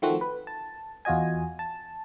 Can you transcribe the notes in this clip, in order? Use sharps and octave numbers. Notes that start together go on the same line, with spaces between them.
D#3 F3 A3 C4 F#4
B4
A5
E2 F4 F#4 D#5 G#5
A5